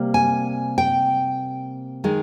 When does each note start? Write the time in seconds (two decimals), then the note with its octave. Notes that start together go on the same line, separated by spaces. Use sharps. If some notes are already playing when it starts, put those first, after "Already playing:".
Already playing: C3 G3 A#3
0.14 G#5
0.78 G5
2.04 D#3 G#3